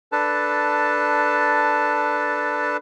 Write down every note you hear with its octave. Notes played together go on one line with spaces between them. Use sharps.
D4 A4 B4 A5